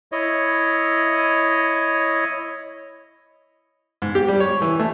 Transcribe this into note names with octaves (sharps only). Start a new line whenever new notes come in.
E4 C#5 D#5
G#2
G4
G3
C#5
E3
A3